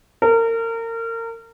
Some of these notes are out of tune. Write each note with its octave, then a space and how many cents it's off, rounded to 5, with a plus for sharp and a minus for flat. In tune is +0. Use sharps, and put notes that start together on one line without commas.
A#4 -30